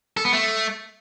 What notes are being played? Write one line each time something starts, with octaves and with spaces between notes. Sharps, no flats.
A4
B3
A3